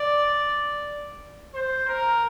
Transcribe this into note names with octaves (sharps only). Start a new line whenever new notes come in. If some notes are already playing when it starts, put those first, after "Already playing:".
Already playing: D5
C5
A#4